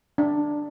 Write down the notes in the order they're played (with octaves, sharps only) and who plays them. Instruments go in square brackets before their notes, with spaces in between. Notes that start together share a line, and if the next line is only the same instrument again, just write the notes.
[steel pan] D4